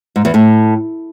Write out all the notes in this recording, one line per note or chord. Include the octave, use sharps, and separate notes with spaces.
G#2
E2
A2